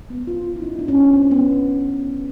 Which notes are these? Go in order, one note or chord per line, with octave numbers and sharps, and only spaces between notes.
B3
F4
E4
D#4
D4
C#4
C4
C4
B3